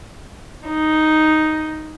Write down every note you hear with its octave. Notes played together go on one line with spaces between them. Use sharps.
D#4